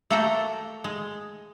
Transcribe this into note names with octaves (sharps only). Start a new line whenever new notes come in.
A3 A#3 F#4 A4 G5 A#5
G#3